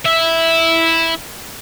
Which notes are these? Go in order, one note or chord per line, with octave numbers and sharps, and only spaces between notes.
E4 E5